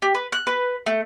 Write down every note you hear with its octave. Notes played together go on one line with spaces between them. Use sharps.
G4
B4
F#6
B4
A3